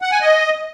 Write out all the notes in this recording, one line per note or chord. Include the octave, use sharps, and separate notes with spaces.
F#5
G#5
D#5